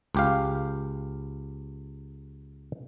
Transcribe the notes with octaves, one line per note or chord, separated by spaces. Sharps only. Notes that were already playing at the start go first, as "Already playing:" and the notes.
C#2 G4 F5